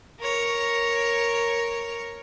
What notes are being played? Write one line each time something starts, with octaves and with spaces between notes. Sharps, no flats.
A#4 C#5